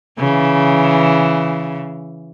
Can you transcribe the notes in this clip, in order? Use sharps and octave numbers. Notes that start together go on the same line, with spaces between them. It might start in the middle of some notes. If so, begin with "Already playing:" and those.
C#3 E3